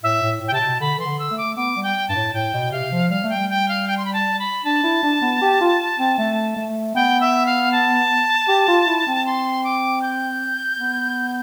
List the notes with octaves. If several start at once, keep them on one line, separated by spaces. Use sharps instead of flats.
A2 E5
A2
A2
G5
C3 A5
B2
D3 B5
E3 C6
D3
E6
A3
D6
B3 D6
G3
G5
G2 A5
A2
A2 G5
B2
C3 F5
F3
G3 F5
A3
G5
G3
G5
F5
G5
C6
B5
A5
B5
D4 A5
E4
D4
B3
G4
F4
C4
A3
A3
B3 G5
E5
F5
A5
G4
F4
E4
C4
C6
D6
G6
B3